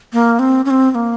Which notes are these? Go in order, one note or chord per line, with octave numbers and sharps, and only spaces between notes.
A#3
C4
C#4
C4
C4
A#3